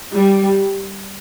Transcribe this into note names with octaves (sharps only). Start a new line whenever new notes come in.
G3